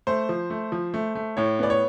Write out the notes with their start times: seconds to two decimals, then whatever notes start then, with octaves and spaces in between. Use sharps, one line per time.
0.07 A3 C5
0.29 F3
0.50 A3
0.72 F3
0.94 A3
1.15 A3
1.37 A2 C#5
1.59 B3 D5
1.70 C#5